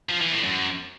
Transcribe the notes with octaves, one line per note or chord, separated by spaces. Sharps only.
F3
E3
A2
F#2